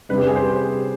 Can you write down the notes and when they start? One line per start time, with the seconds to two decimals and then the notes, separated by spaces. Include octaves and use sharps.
0.09 C3 G3 D4 B4
0.18 G4
0.27 G#4
0.36 C5